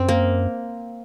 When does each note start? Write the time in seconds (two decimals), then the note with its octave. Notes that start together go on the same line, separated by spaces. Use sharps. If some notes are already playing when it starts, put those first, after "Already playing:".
Already playing: F#2 C4
0.09 A#3